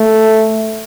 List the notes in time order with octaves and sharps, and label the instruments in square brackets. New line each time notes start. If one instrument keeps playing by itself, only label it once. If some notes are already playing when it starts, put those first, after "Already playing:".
Already playing: [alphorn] A3